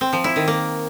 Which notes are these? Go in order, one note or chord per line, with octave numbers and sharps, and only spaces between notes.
C4
F3
E4
D#3
A#3